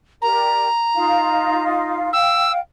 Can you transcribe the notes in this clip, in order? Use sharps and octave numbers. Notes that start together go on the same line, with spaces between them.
G4 A#4 D5 A#5
D#4 F4 F5
F5 G5 E6